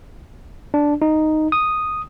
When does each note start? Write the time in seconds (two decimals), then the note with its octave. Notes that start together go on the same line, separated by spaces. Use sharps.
0.74 D4
1.02 D#4
1.52 D#6